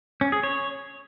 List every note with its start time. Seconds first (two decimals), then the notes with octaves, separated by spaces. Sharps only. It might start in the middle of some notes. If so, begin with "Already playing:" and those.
0.21 C#4
0.32 G#4
0.43 C#5